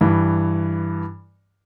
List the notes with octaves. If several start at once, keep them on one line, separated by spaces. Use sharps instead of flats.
G2 E3